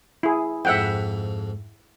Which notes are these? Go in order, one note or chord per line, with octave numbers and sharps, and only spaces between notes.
E4 G#4
F2 G#2 E5 F#5 G5